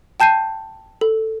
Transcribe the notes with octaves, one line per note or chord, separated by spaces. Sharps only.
G5 A5 G6 C7 D#7
A4